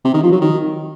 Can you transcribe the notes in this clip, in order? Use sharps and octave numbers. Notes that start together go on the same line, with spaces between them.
C3
D#3
F3
F#3
D#3